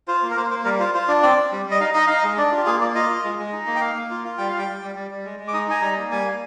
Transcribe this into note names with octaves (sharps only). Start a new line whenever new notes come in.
F4 C5
A#3
A#4
A#3 C5
A#3 C5
G3 A#4
F4 C5
F4 C5
D4 D5
C4 D5
C4
G3
G3
D#5
D#4 F5
D#4 D#5
D#4 F5
D#5
G#3
D4 D5
F4
G4
A#3 G#4
A#3 D5
F4 D#5
F4
G#3
G#3
D#4
A#3
G5
A#3 F5
A#3
F4
F4
G3 G5
G3 F5
G5
G3
G3
G3
G3
G#3
G#3
D6
D#4 D#6
D#4 G#5
G3 A#5
A#3
G3 G#5
A#3